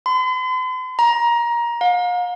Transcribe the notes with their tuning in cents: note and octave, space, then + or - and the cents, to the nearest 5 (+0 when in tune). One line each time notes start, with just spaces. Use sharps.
C6 -45
A#5 +20
F5 +40